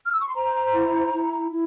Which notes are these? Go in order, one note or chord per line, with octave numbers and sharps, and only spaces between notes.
F6
E6
C#6
C6
C5 A#5
E4
E4
E4